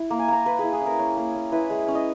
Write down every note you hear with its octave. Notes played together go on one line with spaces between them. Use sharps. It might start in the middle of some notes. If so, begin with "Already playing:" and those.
Already playing: E4
A#3
G#5
A#3 A#5
A#3 B4
E4 G#4
G#4
C#4 A#4
C#4
A#3
C#4
E4 B4
G#3
C#4
D#5